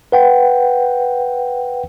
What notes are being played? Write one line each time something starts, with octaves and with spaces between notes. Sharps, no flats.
B4 F#5 G5